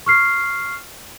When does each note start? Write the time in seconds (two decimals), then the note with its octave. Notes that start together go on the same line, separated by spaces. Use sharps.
0.06 C#6 F6 C7